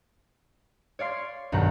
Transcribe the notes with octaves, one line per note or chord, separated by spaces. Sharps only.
C#5 D5 F5 C6
B1 G2 D#3 F#5 A#5 G6